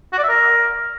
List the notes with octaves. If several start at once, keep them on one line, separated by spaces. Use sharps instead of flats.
F#4
D5
E5
A#4